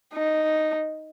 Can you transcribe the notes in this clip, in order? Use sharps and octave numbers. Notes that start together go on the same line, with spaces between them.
D#4